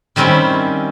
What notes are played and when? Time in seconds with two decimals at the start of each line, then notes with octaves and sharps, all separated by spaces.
0.16 D#3 G3 C4 C#4 E4